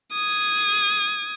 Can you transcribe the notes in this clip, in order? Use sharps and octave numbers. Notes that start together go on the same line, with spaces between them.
D#6 G#6